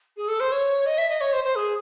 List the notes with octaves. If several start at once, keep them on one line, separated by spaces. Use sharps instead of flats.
G#4
A4
C5
C#5
D#5
E5
D#5
C#5
C5
C5
G#4